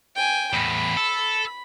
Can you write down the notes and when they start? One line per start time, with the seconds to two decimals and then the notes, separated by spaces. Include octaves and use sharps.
0.16 G5 G#5
0.53 E2 A2 B5
0.97 A4